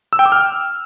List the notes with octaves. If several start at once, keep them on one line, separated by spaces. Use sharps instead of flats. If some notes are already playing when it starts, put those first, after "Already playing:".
E6
G5
D6
F6